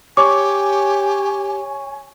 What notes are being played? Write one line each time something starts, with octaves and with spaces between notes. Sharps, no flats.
G4 C#5 G#5 C#6 D6